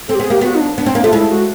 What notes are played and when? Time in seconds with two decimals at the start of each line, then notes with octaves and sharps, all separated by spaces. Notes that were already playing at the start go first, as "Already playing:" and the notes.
0.09 C4 A4
0.15 G4
0.20 B3 G#4
0.30 A#3 G4
0.41 B3 F#4
0.55 D#4
0.60 D4
0.78 B3 D4
0.86 C4
0.95 A#3 D4
1.04 A3 F4
1.13 G#3 E4
1.30 F#4